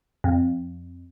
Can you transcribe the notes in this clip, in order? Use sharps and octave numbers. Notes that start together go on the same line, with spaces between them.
F2